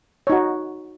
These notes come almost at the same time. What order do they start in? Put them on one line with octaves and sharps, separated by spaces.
C#5 D#4 F#4